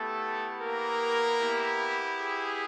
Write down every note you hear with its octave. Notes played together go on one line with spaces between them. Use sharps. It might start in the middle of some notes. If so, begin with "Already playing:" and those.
Already playing: A3 B3 E4 G4 A4
A#3 A#4
B3 E4 G4
G#4